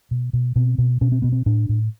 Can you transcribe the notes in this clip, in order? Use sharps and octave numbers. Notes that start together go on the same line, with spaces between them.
B2
B2
B2 C4
B2
B2 C#4
C4
B2 B3
C4
A2 D4
A2